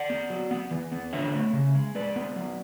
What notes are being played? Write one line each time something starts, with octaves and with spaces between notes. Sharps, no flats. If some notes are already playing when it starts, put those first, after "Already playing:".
Already playing: D5 F#5
B3
F#3
B3
E3
B3
D3 C#5 E5
A3
C#3
G#3
G#3 B4 D5
B3
F#3